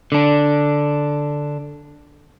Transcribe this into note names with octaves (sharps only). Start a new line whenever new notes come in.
D3 D4